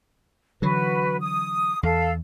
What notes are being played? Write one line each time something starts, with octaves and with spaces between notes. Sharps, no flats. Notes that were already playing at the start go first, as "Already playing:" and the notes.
D3 E3 F#3 F#4 B4
D#6
E2 A4 F5